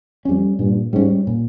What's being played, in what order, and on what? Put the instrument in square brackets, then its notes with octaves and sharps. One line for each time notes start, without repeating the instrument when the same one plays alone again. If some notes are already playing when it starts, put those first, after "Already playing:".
[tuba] F2 [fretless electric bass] G3 C#4
[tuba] G2 [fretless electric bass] A#2
[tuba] G#2 [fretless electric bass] G3 C#4
[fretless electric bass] A#2